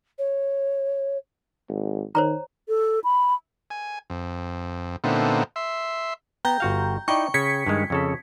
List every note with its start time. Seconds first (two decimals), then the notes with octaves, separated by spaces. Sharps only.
0.18 C#5
1.68 G#1
2.15 D#3 C5 C#5 A#5
2.69 A4
3.04 B5
3.70 G#5
4.10 F2
5.04 A#2 D3 A3 B3 C4 D#4
5.56 E5 C6
6.45 B3 G5 A#5 G6
6.60 G1 F#4 F5
7.08 D#4 E4 D5 G5 C#6
7.34 C#3 G#6 B6 C#7
7.66 G2 D#3 G#3
7.90 F2 C#3 A4